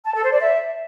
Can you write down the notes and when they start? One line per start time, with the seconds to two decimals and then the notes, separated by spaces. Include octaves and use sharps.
0.06 A5
0.14 A4
0.23 C5
0.32 D5
0.40 E5